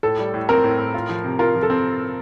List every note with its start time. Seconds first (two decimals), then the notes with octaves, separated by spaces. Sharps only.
0.03 A2 A4
0.19 G3
0.34 A2
0.49 C4 A#4
0.64 A2
0.78 A2
0.94 F4
1.09 F3
1.24 C3
1.39 F4 A#4
1.55 F3
1.63 A4
1.70 C4